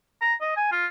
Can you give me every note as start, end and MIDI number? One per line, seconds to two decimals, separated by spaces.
0.21 0.34 82
0.41 0.52 75
0.56 0.70 80
0.72 0.86 65